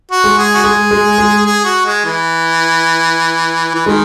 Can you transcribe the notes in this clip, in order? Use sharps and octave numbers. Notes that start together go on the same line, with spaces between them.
F#4
G#3
G#4
F#4
G#3 G#4
G#3
G#3
G#4
F#4
G#3
E3
E3
D#3 G#3